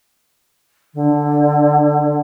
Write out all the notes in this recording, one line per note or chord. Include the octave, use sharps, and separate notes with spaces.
D3